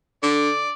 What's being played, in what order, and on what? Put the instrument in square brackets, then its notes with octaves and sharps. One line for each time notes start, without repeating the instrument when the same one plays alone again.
[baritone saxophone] D3 [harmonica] D5